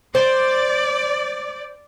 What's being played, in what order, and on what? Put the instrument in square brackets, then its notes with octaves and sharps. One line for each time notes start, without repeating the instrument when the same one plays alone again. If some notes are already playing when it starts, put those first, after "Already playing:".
[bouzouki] C5 [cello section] D5